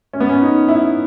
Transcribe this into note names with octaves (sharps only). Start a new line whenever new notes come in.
C#4
B3
C#4
D#4
E4